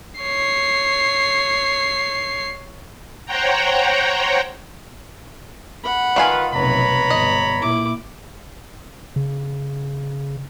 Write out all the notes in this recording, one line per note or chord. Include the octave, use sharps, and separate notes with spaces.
C#5 C7
C5 C#5 F#5 G5 A#5
F#5 B5
D#3 F4 B4 F5 G#5
F1 B1 B4 C#5 A#5 B5
G1 D#5
A#2 E4 D6
C#3